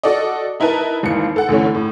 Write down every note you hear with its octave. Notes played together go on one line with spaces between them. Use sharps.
F#4 A4 D5 D#5
D#4 E4 A#4 B4 A5
G#1 D#2 E3 C#7
A4 F#5
D2 D3 E3 C#4
A2